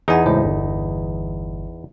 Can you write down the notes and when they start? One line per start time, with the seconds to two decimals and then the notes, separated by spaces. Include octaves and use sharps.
0.08 E2 D#4 G#4 F#5 G#5
0.26 C#2 A2 C5
0.44 G1